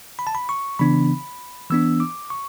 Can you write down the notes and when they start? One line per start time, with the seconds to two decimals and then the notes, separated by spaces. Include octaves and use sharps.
0.19 B5
0.27 A5
0.35 B5
0.49 C#6
0.79 C#3 E3 B3 D4 B5
1.70 E3 B3 D4 E6
2.00 D6
2.30 C#6